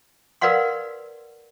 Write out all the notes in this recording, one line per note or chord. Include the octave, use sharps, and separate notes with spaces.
A#4 B4 D5 F5 F#5 C6